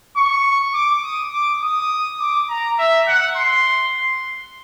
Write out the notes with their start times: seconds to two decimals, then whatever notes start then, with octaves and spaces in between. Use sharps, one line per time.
0.16 C#6
0.74 D6
1.03 D#6
1.32 D6
1.62 D#6
2.20 D6
2.49 A#5
2.79 E5
3.08 F#5
3.37 C6